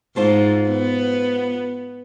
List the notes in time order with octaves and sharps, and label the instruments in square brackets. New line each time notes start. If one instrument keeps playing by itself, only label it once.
[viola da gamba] G#2 [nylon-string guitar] F4 C5 A5
[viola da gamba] B3